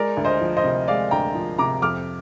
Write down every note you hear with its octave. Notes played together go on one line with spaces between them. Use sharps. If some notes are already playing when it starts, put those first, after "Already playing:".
Already playing: G#3 A#4 D5
D2
C5 D#5
F3
C5 D#5
C3
G#3 D5 F5
D2 G5 A#5
F3
C3 A#5 D6
F2 D6 F6